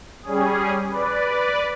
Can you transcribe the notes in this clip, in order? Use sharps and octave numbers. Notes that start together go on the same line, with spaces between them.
G3 C#4 G#4
B4 D5